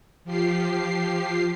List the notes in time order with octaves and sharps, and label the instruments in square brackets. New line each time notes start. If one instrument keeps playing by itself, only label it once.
[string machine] F3 G4 C7